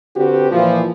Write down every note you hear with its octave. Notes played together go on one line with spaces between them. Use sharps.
D3 C4 F#4 G4 B4
A#2 E3 F3